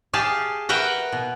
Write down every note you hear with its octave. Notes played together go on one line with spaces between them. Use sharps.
G4 G#4 F5 G5 A5
A#4 B4 E5 F#5 G5 A#5
B2